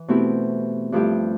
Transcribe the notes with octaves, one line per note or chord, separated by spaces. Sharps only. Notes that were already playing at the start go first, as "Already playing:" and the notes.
Already playing: E3
B2 A3 C4 E4 G4
G2 F3 A3 E4 G4